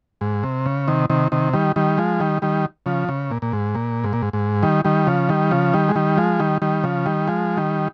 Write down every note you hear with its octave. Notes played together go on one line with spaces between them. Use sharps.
G#2
C3
C#3
C3 D#3
C3 D#3
C3 D#3
D#3 G3
D#3 G3
F3 G#3
D#3 G3
D#3 G3
C#3 F3
C#3
A#2
A#2
G#2
A#2
G#2
A#2
G#2
G#2
D#3 G3
D#3 G3
C#3 F3
D#3 G3
C#3 F3
D#3 G3
G#3
D#3 G3
F3 G#3
D#3 G3
D#3 G3
C#3 F3
D#3 G3
F3 G#3
D#3 G3